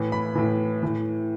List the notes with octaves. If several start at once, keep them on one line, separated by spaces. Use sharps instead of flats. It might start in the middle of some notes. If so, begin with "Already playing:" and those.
Already playing: A2 E3
B5
A2 E3
A2 E3